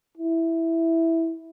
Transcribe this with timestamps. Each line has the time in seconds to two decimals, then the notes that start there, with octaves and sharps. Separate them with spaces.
0.18 E4